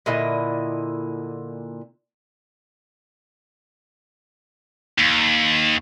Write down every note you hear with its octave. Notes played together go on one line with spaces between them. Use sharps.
A#2 D3 E4 D#5
D#2